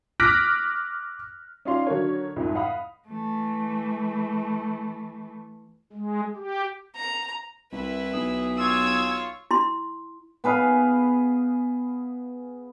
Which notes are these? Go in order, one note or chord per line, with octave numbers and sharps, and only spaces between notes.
D6 F6 F#6 A#6 B6 D7
C#4 D#4 F4 D5 F5 C6
D3 F#3 A#4 C#5
C2 F2 G#2 F3 G#3
D#5 F5 F#5 B5 D#6
E3 A3
G#3
G4
A#5
C2 E4 B4
B1 G#4
F4 C#5 E6 G#6
E4 C6
B3 G#4 B4 F5